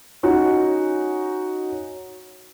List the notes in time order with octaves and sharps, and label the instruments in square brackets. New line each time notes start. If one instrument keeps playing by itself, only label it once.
[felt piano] C#4 D#4 F#4